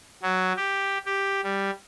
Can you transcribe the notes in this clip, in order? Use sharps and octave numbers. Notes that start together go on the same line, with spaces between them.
F#3
G4
G4
G3